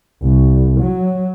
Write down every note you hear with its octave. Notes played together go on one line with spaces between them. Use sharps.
C2
F#3